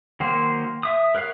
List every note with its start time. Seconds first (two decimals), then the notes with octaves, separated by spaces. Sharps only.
0.20 D#3 F#3 A#3 C5
0.83 E5 D#6
1.15 A#4 B4 C#5 F5